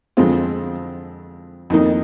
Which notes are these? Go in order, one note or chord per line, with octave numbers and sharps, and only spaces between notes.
F2 D3 G#3 C4 F4
F2 D#3 A#3 D#4